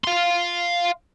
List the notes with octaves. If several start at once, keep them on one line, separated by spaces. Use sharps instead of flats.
F5 C6